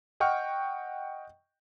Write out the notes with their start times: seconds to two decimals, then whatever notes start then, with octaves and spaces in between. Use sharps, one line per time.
0.20 D#5 F#5 G5 C#6 F6